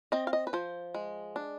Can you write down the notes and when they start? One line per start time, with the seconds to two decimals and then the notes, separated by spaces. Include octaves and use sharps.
0.12 C4 D#5
0.27 F5
0.33 D#5
0.47 B4
0.53 F3 C5
0.94 G#3
1.36 D4